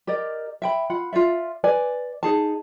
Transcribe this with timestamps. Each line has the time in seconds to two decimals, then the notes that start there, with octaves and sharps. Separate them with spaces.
0.07 G4 A#4 D5 D#5
0.62 E5 G5 B5
0.90 F4 F#5 B5
1.13 F4 C5 D5 E5
1.64 B4 D5 G#5
2.23 D#4 G#4 A5